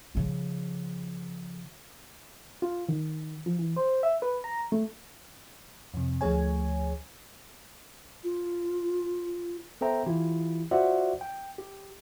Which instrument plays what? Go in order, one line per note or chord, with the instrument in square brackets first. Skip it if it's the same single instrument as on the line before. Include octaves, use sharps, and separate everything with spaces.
[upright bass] C#3 F3
[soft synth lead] F4
D#3
F3
E3
C5
E5
B4
A#5
A3
[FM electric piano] F2 C3
D2 F3 A3 G#4 C#5 G#5
[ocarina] F4
[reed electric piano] B3 A4 C5 E5 G5 A#5
E3 E4 F4 G4
F4 F#4 C5 D5 E5 F#5
G5
G4